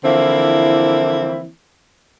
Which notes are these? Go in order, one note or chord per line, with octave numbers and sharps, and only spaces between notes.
D3 E3 F3 A#3 C4 E4